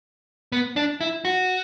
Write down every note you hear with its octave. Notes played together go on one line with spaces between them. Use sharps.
B3
D4
E4
F#4